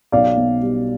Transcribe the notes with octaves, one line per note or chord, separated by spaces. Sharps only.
B1 D5 F5
B2
G3